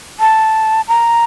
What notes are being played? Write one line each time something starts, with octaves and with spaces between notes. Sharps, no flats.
A5
A#5